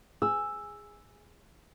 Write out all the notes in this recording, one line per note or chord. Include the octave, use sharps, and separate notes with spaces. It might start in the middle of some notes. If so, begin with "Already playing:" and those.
G#4 E6